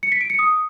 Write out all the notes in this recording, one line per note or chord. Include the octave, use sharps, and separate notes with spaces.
C#7
B6
D7
C#7
D#6